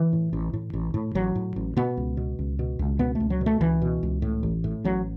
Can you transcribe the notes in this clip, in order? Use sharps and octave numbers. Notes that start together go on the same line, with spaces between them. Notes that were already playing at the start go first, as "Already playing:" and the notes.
Already playing: E3
A2
A1
A2
A1
A2
A1 F#3
A2
A1
B2 B3
C#2
B2
C#2
B2
C#2
B2 B3
A3
C#2
F#3
B2
A3
C#2 E3
B2
C#2
A2
A1
A2
A1 F#3